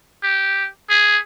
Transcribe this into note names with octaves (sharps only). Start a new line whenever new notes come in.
G4
G#4